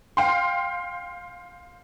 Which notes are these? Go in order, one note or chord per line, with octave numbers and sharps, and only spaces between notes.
F5 G5 C6